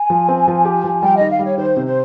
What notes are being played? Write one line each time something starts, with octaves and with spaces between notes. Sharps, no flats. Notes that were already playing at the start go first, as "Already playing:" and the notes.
Already playing: G#5
F3
C4
F3
G4
F3
G3 G5
D#3 D#5
F5
G3
C#5
D#3 C5
C3
C5